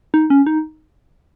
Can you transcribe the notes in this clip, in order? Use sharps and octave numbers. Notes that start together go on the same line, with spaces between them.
D#4
C#4
D#4